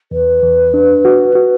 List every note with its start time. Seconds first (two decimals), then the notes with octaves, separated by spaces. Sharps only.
0.11 E2 B4
0.42 E2
0.74 D4
1.05 F#4
1.35 F#4